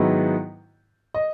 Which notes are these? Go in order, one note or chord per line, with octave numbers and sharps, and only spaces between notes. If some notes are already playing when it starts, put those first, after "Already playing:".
Already playing: G#2 D#3 F#3 B3 E4
D#5